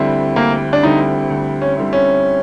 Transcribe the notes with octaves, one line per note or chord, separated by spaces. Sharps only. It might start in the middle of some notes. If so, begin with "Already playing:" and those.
Already playing: D2 D3 G3 C4 E4
D2 A#3
D4
D3 G3 C4 D#4 E4
D2
C#4
D3 G3 C4 E4
C#4